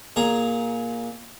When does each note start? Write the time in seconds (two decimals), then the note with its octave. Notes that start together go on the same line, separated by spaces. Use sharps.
0.16 A#2 G#4 A#5